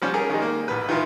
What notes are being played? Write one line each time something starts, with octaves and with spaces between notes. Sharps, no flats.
F3 G3 C#4
C#4 G4 G#4 A#4 G#5
D#3 G#3
A#3
A1 B4
D#3 E3 E4 F4